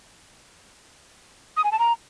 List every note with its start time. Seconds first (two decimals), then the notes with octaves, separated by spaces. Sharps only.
1.57 D#6
1.64 G#5
1.72 A5
1.79 A#5